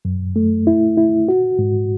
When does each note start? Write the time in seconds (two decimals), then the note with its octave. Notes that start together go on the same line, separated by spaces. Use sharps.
0.05 F#2
0.36 A3
0.67 E4
0.97 E4
1.28 F#4
1.59 G#2